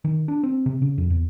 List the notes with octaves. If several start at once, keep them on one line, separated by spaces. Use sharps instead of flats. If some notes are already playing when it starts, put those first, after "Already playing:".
D#3
D4
C4
C3
C#3
F2
E2